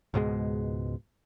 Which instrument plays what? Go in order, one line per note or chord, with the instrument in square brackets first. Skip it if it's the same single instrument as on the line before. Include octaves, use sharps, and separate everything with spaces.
[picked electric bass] C#2 G#2 B2 G#3